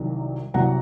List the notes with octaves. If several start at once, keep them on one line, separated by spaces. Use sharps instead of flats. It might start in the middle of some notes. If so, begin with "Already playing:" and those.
Already playing: C2 C3 D#3 F#3
C2 C3 F#3 F#5 A#5